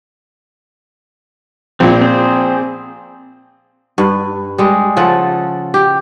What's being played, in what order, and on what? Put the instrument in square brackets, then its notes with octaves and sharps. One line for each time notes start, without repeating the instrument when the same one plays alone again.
[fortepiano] A#1 A#2 [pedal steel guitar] C4
[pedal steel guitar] C4 G#4 C5
[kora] G2 B4
G3 G#3
C#3 F3 A4 F#5
G4